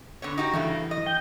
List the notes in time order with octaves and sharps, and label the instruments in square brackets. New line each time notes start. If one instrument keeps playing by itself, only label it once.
[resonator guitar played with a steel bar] D3 B3 C#5
D#4 F#4 G4
[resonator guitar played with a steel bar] G2 C#3 A3 [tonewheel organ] E3
[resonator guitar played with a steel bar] D#5
[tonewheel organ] G5 G6